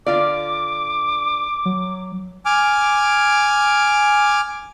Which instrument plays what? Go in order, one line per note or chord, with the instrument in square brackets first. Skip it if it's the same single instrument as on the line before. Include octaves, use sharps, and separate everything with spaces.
[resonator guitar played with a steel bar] D3 F4 D5 [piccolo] D6
[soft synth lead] F#3
[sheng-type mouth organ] G#5 D6 F6